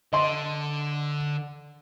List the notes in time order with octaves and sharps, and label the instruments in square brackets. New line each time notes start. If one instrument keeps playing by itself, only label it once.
[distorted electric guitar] D3 [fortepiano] D#5 C6